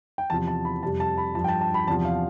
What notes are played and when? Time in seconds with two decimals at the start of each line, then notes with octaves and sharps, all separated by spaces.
0.18 G5
0.30 E2 C3 F3 A5
0.47 A5
0.65 B5
0.82 F2 C3 G3 A5
1.00 A5
1.18 B5
1.35 G2 F3 A5
1.44 G5
1.48 A5
1.61 A5
1.74 B5
1.88 E2 C3 F3 A5
2.05 F5